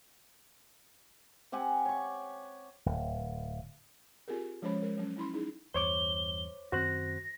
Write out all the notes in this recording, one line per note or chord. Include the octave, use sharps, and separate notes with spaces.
C4 G4 F#5 G#5
C#5 C#6
D1
C4 F4 G4 G#4 A#4
F3 G#3 C#4 C5 C#5 B5
G#3 A#4 C5
F#3 C#4
C#4 E4 B5 C6
D#4 E4 G#4
E2 G2 C5 C#5 D6 G7
F#2 D#3 C4 F#4 C5 F#6 A#6